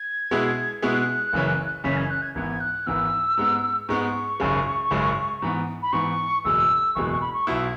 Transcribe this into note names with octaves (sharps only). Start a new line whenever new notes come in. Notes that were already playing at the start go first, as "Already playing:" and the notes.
Already playing: G#6
B2 G#3 B3 E4 G#4
B2 G#3 B3 E4 G#4 F#6
F#1 F#2 C#3 E3 C#4
F#1 F#2 C#3 E3 C#4 B6
G#6
F#6
G#6
G#1 G#2 E3 B3 G#6
F#6
G#1 G#2 E3 B3 E6
G#2 G#3 B3
G#2 G#3 B3 C#6
G#1 F#2 C#3 G#3
G#1 F#2 C#3 G#3
G#2 E3 B3
B5
G#2 E3 B3 C#6
F#1 E2 B2 G#3 E6
F#1 E2 B2 G#3 C#6
C#6
B5
C#6
B1 B2 B3 E4 G#6